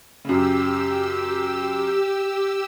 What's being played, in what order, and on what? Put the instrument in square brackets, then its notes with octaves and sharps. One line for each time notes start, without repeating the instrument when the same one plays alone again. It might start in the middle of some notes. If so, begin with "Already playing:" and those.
[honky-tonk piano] F#2 C#3 [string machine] G4 E6